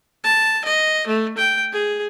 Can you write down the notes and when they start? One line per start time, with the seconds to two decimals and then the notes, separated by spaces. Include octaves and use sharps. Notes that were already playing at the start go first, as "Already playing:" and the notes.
0.24 A5
0.64 D#5
1.07 A3
1.37 G5
1.72 G#4